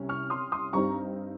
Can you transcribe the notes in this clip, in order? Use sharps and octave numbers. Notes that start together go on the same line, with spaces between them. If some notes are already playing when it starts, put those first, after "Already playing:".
Already playing: C2 C3 C#4
C#6 F6
C6 D#6
C6 D#6
G2 G3 C4 D#4 A#5 C#6